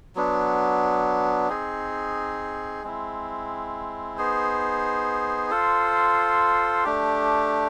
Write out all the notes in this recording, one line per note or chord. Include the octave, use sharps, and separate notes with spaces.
F#3 B3 D4
C4 D#4 G#4
G#3 C4 E4
B3 D#4 G#4 C5
F4 A4 C5
A3 D4 G4